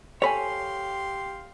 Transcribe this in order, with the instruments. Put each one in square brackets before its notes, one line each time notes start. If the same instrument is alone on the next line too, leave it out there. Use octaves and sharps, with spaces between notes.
[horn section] G4 F5 C6 [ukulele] A4 G#5 [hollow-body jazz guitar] C#5 B5